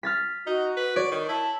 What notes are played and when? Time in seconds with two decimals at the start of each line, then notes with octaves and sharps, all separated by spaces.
0.03 F6 A6 B6
0.47 D#4 F#4
0.77 B4
0.96 C#5 D5
1.12 D#3
1.29 E4 A5